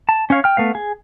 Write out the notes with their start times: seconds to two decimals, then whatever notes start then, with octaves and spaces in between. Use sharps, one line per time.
0.09 A5
0.30 C#4 C#5 F5
0.44 G5 F6
0.57 A3 B3 F5
0.75 G#4